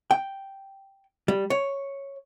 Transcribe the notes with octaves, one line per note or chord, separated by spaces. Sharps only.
G5
G3
C#5